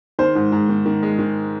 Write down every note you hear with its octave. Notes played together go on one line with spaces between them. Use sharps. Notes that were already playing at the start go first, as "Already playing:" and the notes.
D#3 C5
G#2
G#2
D#3
D#3
G#3
D#3